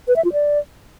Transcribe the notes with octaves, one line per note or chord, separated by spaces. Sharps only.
B4
E5
F4
D5